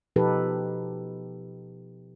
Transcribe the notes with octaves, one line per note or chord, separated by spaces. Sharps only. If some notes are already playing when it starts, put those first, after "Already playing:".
B2 F3 D#4 G4 A4 B4